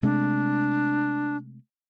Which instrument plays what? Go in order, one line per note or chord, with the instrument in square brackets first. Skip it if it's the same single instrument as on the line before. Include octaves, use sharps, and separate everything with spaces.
[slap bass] C3 G#3 A3 [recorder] D4